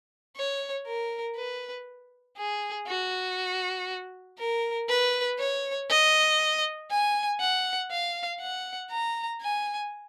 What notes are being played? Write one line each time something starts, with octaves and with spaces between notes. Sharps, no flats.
C#5
A#4
B4
G#4
F#4
A#4
B4
C#5
D#5
G#5
F#5
F5
F#5
A#5
G#5